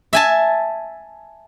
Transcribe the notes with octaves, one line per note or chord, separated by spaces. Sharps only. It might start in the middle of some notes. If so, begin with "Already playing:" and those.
E5 G#5 A5